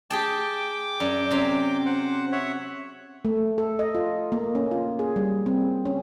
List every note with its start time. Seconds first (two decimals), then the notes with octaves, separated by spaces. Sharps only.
0.10 G4 G#4 G5 A5 D6
1.00 F#2 D5
1.31 C3 F#3 C#4
1.86 C5 F#5
2.32 C#5 E5 F#5
3.25 A3
3.58 A4
3.79 D#5
3.95 F4
4.32 A#3
4.55 C#4
4.71 F4
4.99 G#4
5.16 G3
5.46 C4
5.85 C#4